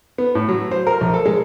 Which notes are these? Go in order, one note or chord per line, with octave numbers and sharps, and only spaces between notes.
B3
A2
F#3
C5
A#4
A#1
A4
G#3